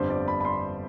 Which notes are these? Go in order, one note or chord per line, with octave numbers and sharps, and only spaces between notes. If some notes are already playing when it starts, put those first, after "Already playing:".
Already playing: G1 F2 D3 G3 C5
D5
B5
B5
C6